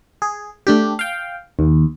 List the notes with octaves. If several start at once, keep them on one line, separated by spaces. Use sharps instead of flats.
G#4
A3 D4 G4
F5 G5
D#2